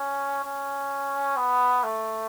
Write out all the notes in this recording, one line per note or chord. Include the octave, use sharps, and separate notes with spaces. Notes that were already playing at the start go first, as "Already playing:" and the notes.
Already playing: C#4
C#4
B3
A3